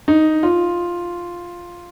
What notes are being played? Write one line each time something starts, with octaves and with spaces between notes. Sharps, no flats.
D#4
F4